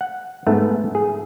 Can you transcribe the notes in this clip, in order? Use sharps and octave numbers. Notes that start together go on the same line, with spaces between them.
F#5
G#2 A3 B3
G#4